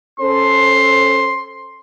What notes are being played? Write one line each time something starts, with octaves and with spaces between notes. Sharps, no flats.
C#4 A4 C5 C6